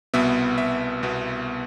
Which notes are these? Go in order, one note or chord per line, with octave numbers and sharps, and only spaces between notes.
C2 B2 B3 E5
E5
C2 B2 B3